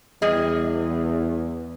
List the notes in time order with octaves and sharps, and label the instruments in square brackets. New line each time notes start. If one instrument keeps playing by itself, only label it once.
[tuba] E2 [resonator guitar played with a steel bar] G3 G#4 D#5